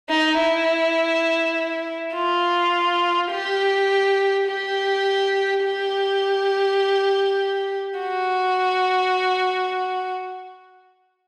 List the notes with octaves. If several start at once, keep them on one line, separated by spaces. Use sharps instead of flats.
D#4
E4
F4
G4
G4
G4
F#4